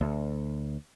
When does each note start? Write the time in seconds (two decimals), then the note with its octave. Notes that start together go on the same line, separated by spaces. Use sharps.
0.01 D2